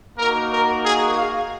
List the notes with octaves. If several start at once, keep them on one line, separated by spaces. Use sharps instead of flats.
A#3 D#4 F#4 A#4
A#4
G#4
F5